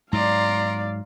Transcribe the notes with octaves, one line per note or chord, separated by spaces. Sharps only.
G#2 F#3 D5 F5 A#5 C6